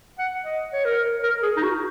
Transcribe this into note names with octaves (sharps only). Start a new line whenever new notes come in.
F#5
D#5
C#5
A#4
A#4
G#4
D#4
F#4